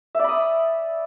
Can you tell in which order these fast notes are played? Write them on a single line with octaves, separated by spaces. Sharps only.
E5 D5 B5 D#6